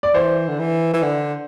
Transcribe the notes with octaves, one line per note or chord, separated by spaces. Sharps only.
D5
E3 C5
D3
E3
E3
D3